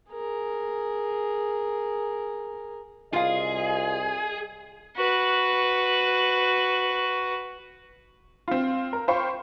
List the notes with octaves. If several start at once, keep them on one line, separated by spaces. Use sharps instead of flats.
G#4 A#4
C2 C3 F4 G#4 D#5 F5
F#4 B4
C4 F4
A#4
F4 C5 F5 G5 B5 C#6